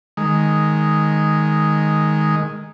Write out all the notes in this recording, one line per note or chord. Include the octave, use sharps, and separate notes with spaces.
D#3 G#3